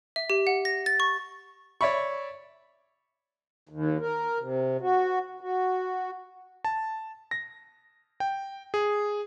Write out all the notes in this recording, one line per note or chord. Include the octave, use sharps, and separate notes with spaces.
E5
G4
F#5
A#6
A6
C#6
C#5 D5 E5 B5 C#6
D#2
A#4
C3
F#4
F#4
A5
A#6
G5
G#4